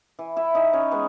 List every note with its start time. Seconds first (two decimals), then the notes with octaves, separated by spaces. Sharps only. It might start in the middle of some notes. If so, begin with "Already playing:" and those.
0.19 E3
0.36 E4 E5
0.55 E3 D#4 D#5
0.73 C#4 C#5
0.91 G#3 B3 B4